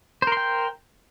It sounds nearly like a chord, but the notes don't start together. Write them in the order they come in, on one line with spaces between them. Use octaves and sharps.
C5 A#4 C6 G5